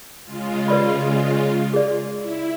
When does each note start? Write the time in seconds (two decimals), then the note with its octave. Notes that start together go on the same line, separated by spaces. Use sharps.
0.24 C#3 G#3 F4
0.68 B4 D5 B5
1.74 G#4 D5
2.17 E4